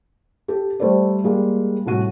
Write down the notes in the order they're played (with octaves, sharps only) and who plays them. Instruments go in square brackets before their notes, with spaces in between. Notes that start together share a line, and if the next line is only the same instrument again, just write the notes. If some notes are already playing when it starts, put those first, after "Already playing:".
[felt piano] G4 A4
G3 A3 A4 C5 D5
G3 G#3 A#3
C2 A2 F#4 D#7